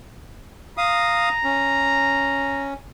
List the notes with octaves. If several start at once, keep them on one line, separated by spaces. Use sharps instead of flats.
F5 A#5 D#6
C#4